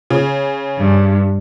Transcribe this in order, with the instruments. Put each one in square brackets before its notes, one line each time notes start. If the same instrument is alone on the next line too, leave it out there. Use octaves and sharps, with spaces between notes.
[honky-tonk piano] C#3
[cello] G2